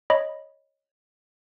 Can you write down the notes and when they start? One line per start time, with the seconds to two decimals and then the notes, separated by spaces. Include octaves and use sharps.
0.10 C#5 D#5 B5